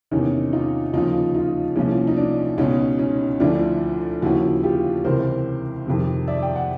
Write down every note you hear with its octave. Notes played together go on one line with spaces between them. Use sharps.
E2 C3 D#3 C#4 D#4
D#4 F4
D#2 C#3 F3 D#4 F4
D#4 F4
C2 A#2 F3 C#4
D#4
D4
C#2 B2 C#4 D#4
C#4 D#4
D2 D3 F3 D4 E4
D#2 C#3 F3 E4 F#4
F4 G4
C#2 C3 E3 A#4 C5
F2 C3 D#3
D5 E5
G5
F#5